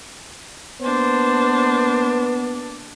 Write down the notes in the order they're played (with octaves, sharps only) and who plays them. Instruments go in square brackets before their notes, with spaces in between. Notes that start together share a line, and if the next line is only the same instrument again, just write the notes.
[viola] A#3 D4 [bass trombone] B3 [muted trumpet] C5